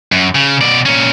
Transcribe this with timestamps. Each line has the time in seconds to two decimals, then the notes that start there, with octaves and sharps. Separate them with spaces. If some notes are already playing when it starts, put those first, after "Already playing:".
0.12 F#2
0.35 C#3
0.61 B2 D5
0.86 A#2 C#4